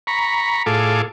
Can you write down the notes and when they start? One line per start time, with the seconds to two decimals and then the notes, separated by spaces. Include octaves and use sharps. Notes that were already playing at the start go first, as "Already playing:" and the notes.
0.07 A#5 B5 C#6
0.66 A2 F4 G#4 A4 D6